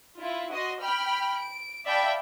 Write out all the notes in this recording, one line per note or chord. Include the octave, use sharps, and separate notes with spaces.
E4 F4
F#4 D#5 C6
G5 B5 F6
D7
D5 E5 F5 G5 A5 B5